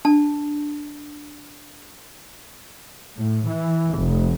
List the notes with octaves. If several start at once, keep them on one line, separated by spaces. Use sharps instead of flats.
D4 A5
A2
E3
F1